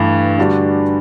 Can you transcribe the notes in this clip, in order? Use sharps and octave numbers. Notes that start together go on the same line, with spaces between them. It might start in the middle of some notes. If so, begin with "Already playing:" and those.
Already playing: G2 E3 A3
D3 G3 D4 F#4